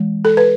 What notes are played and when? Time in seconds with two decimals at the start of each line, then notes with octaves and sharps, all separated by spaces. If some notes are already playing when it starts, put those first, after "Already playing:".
Already playing: E3 G#3
0.25 A4
0.37 B4